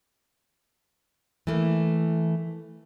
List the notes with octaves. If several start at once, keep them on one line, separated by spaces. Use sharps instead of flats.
E3 A3 A#3